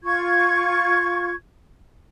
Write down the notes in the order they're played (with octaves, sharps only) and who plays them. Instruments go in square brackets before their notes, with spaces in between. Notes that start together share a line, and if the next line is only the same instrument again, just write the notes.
[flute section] F4 C#6 G#6